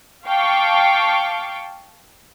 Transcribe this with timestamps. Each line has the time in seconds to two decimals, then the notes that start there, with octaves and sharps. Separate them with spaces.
0.25 F5 G5 A5 C#6 D6